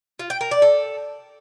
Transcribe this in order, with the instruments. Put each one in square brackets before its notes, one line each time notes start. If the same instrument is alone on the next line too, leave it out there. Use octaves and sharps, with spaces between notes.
[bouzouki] F4
G5
A#4
D5
A4